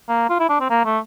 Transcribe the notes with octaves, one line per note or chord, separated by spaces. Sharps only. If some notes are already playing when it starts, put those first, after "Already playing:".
A#3
F4
E4
D4
C4
A#3
A3